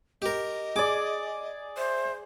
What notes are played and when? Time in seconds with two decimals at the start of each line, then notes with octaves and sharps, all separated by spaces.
0.22 G4 A#4 D#5
0.76 G#4 D5 D6
1.77 C5 E5